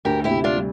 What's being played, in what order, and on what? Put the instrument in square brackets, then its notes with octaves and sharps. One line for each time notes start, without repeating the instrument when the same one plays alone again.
[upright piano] D2 [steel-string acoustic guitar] G4 A#4
[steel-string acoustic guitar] E4 G4
[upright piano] C3
[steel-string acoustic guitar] D4 F4
[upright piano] G3